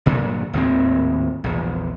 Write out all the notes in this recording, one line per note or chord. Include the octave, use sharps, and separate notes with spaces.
G1 A#2 D3 F#3
G#1 D#2 A2 C4
A#1 E2